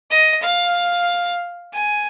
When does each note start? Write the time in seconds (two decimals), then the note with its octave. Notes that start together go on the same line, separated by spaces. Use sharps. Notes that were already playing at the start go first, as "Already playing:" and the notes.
0.10 D#5
0.43 F5
1.73 G#5